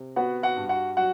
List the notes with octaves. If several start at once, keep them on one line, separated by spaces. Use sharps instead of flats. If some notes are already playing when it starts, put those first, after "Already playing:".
Already playing: C3
B3 F#4 F#5
F#4 F#5
G2
F#4 F#5
F#3 F#4 F#5